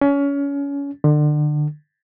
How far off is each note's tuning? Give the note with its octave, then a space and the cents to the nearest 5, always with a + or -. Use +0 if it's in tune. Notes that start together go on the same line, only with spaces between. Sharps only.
C#4 +25
D3 +30